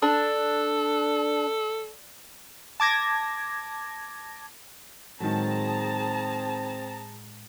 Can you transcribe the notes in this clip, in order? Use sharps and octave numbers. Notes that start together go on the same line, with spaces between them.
D4 A4
A5 D6 G#6 A#6
A2 D#3 F#3 G#3 C4 G#4 A5 A#5